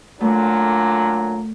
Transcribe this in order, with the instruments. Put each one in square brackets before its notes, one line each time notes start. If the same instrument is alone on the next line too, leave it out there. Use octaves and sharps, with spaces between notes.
[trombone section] A#2 D3 F#3 [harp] A3